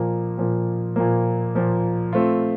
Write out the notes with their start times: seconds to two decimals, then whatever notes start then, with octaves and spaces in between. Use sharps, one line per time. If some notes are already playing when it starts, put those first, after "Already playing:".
Already playing: A#2 F3 A#3
0.38 A#2 F3 A#3
0.96 A#2 F3 A#3
1.55 A#2 F3 A#3
2.13 A3 C4 F4